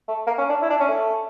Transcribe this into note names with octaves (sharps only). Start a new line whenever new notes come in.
A3
A#3
C#4
D4
E4
D4
C#4
A3